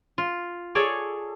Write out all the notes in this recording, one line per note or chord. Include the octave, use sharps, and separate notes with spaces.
F4
G#4 A4 C#5 D5